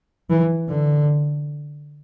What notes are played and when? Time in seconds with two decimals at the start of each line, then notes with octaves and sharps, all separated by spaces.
0.30 E3
0.69 D3